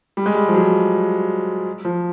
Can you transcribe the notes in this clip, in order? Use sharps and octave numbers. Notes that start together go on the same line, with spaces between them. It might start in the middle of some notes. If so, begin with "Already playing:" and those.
G3
G#3
G3
F3
F#3
F3